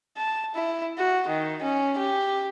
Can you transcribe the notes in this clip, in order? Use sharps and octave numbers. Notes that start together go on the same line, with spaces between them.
A5
E4
F#4
D#3
C#4
G4